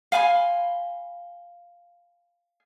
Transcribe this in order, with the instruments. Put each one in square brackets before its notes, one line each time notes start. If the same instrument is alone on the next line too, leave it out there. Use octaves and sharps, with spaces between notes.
[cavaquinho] F5 G#5 B5 C6